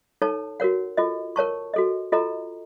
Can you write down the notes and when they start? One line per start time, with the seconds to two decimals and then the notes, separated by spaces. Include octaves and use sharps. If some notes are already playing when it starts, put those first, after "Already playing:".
0.22 D#4 A4 C#5 A5
0.60 F#4 A#4 C#5 F#5
0.97 F4 A4 D#5
1.36 A#4 C#5 A5 C#6
1.74 F#4 A4 D#5
2.12 F4 A4 D#5 A#5